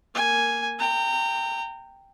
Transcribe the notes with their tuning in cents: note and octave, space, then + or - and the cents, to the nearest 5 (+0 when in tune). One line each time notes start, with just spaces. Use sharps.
A#3 -5 G#5 +0
G5 +0 A#5 -30